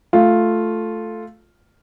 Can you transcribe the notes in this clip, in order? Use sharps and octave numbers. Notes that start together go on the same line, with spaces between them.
A3 F4